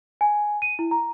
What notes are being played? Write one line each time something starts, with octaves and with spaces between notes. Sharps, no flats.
G#5
D#7
E4
A#5